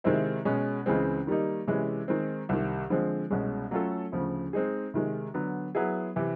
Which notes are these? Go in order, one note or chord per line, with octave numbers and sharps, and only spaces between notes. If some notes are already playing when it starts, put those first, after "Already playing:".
C3 D#3 G#3 C4 E4
B2 G#3 C#4
C#2 C#3 E3 G#3 C4
D#3 G3 A#3 D#4
C3 E3 G#3 C#4
D#3 G#3 C4
C2 C3 D#3
D3 F3 G#3 C4
C2 B2 G#3 C#4
F#3 A3 C#4 F4 A4
D2 C#3 F3
G#3 C4 D#4 G#4
C3 D#3 G#3
D3 F#3 B3
F#3 B3 E4 G#4
C3 E3